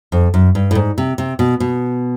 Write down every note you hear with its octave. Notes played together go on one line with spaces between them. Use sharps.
F2
F#2
G2
A2
G#2
C3
C3
B2
B2